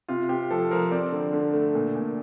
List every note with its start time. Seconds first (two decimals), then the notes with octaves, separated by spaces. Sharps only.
0.08 C3 F4
0.29 C4 G4
0.50 F3 A4
0.71 F3 A#4
0.91 C4 D5
1.12 D3
1.33 D3
1.53 A3
1.75 A#2
1.95 A#2